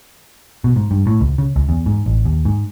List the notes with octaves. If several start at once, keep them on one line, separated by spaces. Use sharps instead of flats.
B2
G#2
G2
A2
C#2
C#3
C#2
E2
G#2
A1
D#2
G#2